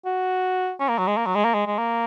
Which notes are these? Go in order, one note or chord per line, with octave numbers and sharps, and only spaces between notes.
F#4
C#4
A#3
F#3
G#3
A#3
F#3
G#3
A#3
G#3
G#3
A#3